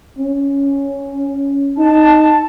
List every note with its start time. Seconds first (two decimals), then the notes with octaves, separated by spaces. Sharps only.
0.18 C#4
1.78 D#4 A5